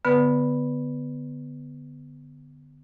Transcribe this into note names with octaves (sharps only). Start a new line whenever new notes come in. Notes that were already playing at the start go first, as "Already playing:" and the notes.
D3 B3 B4